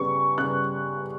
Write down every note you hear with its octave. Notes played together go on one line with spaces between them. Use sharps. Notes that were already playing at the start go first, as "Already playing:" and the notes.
Already playing: C#3 G3 B3 C#6
C#3 G3 B3 F#6